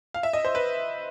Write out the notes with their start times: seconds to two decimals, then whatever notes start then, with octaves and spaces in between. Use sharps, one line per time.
0.14 F5
0.23 E5
0.33 D#5
0.45 C5
0.55 B4